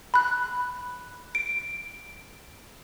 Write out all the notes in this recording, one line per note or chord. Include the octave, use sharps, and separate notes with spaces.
B5 F#6
D7